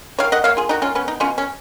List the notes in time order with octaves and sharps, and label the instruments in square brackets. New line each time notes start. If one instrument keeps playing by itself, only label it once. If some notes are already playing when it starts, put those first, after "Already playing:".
[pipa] D#3 C#5 F5
D#5 F#5
A#3 C#5 F5
F4 G#4
D#3 D#4 F#4
C#4 F4
B3 C#4
D#4
B2 C#4 F4
C#4